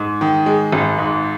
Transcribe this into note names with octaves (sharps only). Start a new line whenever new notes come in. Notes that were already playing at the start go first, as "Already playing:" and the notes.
Already playing: G#2
D#3
G#3
G#1
G#2